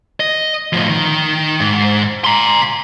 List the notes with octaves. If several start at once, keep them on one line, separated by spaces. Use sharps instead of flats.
D#5
A2 F3
D#3
G#2
A#5 C6